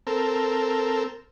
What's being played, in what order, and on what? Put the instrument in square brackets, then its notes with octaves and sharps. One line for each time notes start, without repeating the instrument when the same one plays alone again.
[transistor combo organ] C4 A4 A#4